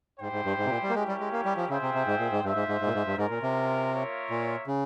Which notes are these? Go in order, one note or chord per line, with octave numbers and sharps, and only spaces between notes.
G#2 E4 G4 C5 G5
G#2
G2
G#2
C3
A#2
G3
A#3
G#3 C#4 E4 G4 A#4 C#5
G3
G#3
A#3
G3
F3
C#3 F4 G#4 C5 E5 G5
C3
C3
G#2
A#2
G#2
G2 F4 C5 E5
G#2
G#2
G#2
A#2
G#2
G2
G#2 C#4 F4 A#4
A#2
C3
A#3 F4 A#4 C#5 E5
A#2
C#3